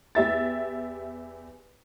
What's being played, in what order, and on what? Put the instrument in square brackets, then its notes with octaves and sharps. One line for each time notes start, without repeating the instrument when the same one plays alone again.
[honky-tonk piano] E2 G4 E5 A6